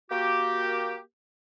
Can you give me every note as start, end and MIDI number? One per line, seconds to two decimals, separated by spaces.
0.11 0.99 58
0.11 0.99 66
0.11 0.99 67